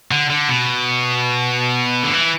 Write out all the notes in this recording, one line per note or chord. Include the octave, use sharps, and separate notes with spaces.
D3
D3
B2
D3
E3